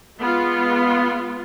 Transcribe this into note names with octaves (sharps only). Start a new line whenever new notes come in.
G#3 B3 F4